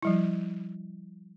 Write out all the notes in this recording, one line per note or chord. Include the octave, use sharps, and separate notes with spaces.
F3 G3 E4